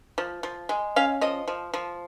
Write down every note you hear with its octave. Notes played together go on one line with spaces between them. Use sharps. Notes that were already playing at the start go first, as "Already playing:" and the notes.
F3
F3
G#3
C#4 F5
F3 D#5
F3
F3